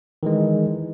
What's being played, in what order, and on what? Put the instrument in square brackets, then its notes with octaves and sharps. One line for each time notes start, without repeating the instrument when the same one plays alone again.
[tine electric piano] D#3 E3 G#3